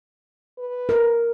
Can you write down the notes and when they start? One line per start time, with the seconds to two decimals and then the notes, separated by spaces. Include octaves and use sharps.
0.58 B4
0.89 A#4